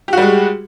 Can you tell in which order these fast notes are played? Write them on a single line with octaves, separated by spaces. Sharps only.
G4 F#4 G3 G#3